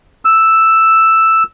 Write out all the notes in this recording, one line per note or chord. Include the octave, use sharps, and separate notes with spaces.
E6